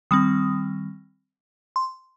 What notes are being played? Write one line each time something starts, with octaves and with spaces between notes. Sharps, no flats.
D#3 G3 C4 D#6
C6